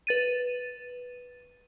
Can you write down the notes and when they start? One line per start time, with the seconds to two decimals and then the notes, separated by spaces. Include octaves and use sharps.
0.07 B4 A6 D#7